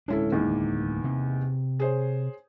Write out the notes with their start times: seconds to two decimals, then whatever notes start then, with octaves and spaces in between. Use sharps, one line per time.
0.08 D1 G#3 C#4 D4 E4 A4
0.32 E2 D#3 A#3
1.04 C3
1.80 G#4 C5 C#5